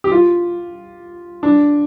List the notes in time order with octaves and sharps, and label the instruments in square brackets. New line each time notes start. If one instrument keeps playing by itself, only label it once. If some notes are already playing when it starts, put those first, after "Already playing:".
[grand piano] G4
F4
D4